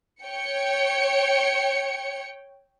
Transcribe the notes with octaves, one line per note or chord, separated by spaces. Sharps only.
C#5 G5 C#7